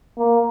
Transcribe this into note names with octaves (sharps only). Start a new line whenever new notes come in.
A#3